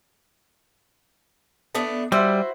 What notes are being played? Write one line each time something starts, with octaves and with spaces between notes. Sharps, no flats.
A3 B3 D4
G3 E4 F#4 C5